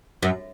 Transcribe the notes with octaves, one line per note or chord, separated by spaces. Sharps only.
F#2